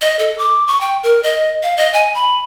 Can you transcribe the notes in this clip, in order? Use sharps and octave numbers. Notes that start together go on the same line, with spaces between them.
D#5
A4
D6
C#6
G5
A#4
D#5
F5
D#5
G#5
B5